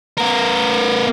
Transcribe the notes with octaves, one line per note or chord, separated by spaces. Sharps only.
B3 A#4